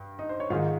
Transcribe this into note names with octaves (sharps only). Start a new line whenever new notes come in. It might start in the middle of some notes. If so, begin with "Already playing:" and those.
Already playing: G2 G5
D#4 D#5
C5
C#5
G#2 D#3 G#3 F4 F5